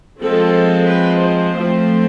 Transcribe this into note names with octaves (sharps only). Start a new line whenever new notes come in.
F3 G#3 C4 A4
B4
C5
F3 A3 C4